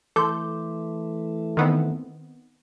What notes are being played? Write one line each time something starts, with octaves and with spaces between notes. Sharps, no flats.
E3 A3 A4 C6 D6 G6
D#3 B3 C4